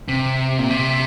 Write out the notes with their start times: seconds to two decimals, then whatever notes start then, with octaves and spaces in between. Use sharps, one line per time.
0.08 C3
0.59 A#2
0.71 C3